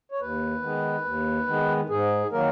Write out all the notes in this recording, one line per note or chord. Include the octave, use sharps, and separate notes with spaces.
C#5
D#2 B4
D#3 G#3 B3
D#2
D#3 G#3 B3
G#2 G#4
D#3 F#3 A#3 A#4